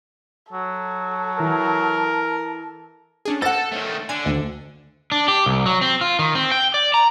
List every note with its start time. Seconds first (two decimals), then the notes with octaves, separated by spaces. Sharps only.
0.53 F#3 A4
1.39 E3 A#4
3.25 C#4 D4 G#4
3.42 A4 C5 F#5 F#6 A6 A#6
3.72 D#3 A3 C#5
4.09 D3 G#5
4.25 D2
5.12 D4
5.28 G4
5.46 C2
5.66 F#3
5.81 C4
6.01 F4
6.19 D#3
6.35 C4
6.52 G5
6.74 D5
6.94 A#5